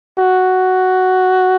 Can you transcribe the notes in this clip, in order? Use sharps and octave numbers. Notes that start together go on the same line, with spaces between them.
F#4